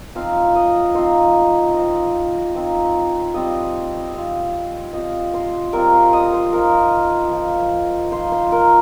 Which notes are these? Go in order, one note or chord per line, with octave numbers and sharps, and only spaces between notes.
F3 C4 D#4 F5
D#5
F3 C4 D#4 C5
F3 C4 D#4 D#5
F3 C4 D#4
G3 C4 F4 D#5
G3 C4 F4 F5
G3 C4 F4 D#5
C5
G3 C4 F4 A#4
C5
D#5
C5
F3 D#4 A#4
F3 D#4
F3 D#4 C5
C5
A#4